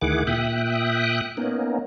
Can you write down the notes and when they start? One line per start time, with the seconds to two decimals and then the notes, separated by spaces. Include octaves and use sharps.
0.01 D2 D#3 E4 G#4 F#5 D6
0.27 A#2 E5 G5 D#6 F#6
1.37 A#3 B3 C#4 D#4